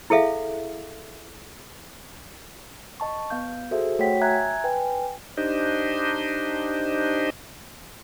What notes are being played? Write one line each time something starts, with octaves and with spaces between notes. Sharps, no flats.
E4 G#4 A4 E5 F5
D#5 A5 C#6
B3 F5 G6
F#4 G#4 A4 C5 E5
A3 F#4 C#5 F#5 G5 B6
E5 G#5 A#5 F#6 G#6
B4 G5 G#5
D4 D#4 G4 C5 D#5